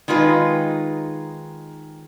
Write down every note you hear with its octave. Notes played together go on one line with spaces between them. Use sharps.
D#3 G#3 D#4 F4 B4